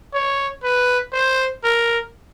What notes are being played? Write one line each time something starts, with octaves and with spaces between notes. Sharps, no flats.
C#5
B4
C5
A#4